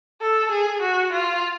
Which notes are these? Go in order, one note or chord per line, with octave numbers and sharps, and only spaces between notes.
A4
G#4
F#4
F4